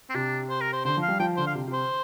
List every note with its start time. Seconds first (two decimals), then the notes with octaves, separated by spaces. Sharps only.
0.10 C4
0.14 C3 D4
0.49 C5
0.61 A#4
0.73 C5
0.85 D3 C5
0.97 F3
1.02 F5
1.08 G3
1.20 F3 G5
1.37 D3 C5
1.47 F5
1.54 C3
1.67 C3
1.73 C5